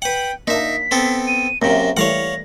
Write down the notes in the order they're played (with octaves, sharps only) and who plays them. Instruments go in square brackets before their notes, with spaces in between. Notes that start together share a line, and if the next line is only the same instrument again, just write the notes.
[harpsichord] B4 F#5 [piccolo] G5
[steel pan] A#3 D4 [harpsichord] D#4 E5 [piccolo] B6
[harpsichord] B3 C4 A4
[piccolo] D#7
[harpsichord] F#2 C3 [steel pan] A#3 [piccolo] A#6
[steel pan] E3 G3 A3 [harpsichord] C#5 F5 F#5 [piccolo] A#6